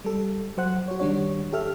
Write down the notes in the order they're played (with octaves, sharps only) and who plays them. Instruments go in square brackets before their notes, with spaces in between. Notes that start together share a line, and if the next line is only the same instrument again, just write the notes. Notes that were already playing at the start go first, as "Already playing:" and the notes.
[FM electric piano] G3 A4
F#3 C5 F#5 F#6
F#4 C#5
D#3 G3 D4 C#5
G4 A4 E5 F6